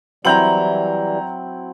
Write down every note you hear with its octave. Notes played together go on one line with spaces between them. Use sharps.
E3 F#3 G3 C4 E4 A#5 G6 F#7